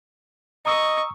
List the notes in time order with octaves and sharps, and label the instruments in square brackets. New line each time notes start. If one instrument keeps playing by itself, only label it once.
[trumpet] D#5 [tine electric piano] A#5 D#6 E6 [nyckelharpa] C#6